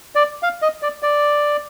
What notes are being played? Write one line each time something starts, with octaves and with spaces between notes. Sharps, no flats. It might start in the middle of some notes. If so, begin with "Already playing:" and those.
D5
F5
D#5
D5
D5